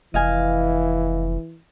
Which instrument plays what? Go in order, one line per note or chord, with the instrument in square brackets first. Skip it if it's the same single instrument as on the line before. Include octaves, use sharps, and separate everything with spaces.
[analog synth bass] F1 [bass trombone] E3 [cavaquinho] D#5 F5 G#5